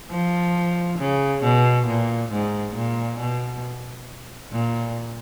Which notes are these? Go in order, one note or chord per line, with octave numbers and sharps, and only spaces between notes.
F3
C#3
B2
A#2
G#2
A#2
B2
A#2